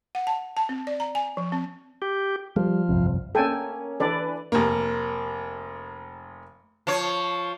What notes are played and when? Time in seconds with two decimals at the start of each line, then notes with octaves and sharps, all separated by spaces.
0.15 F#5
0.27 A5
0.57 A5
0.69 C4
0.87 D5
1.00 A#5
1.15 G#5
1.37 F3
1.52 C4
2.02 G4
2.56 F3 G3
2.89 G1 C2 F2
3.35 A#3 C#4 A4 G5 G#5
4.00 E3 D4 A4 B4 D5
4.52 F1 A#3
6.87 F3 C#5